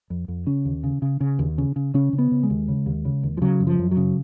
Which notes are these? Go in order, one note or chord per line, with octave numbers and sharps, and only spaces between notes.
F2
F2
C#3 C#4
D#2
C#3
C#3
C#3
D#2
C#3
C#3
C#3 C#4
C#3
B3
C#3
G#3
D#2
C#3
D#2
C#3
D#2
F3
C#3 F#3
F#2
F3
F#2
F#3
C#3